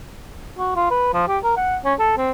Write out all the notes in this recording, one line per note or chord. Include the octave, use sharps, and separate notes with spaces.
F#4
F4
B4
F3
G4
A#4
F#5
C#4
A4
C4